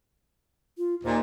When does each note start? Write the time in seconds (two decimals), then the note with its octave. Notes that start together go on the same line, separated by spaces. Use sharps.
0.78 F4
1.04 D#2 A#2 C5